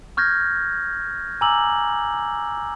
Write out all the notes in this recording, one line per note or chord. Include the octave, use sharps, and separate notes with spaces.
C#6 F6 G6 G#6 A#6
G#5 A#5 D6 E6 F#7